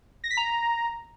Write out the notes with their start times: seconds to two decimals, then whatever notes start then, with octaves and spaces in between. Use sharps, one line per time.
0.24 A#6
0.30 B6
0.37 A#5